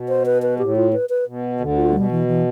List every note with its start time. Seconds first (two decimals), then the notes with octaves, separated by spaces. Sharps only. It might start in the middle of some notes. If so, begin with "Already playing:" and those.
Already playing: B2
0.08 C5
0.26 B4
0.42 B4
0.59 A2 G4
0.76 F4
0.93 B4
1.09 B4
1.27 B2
1.60 D2 D3
1.77 F4
1.88 A2
1.94 B2 G3
2.11 E3
2.28 E3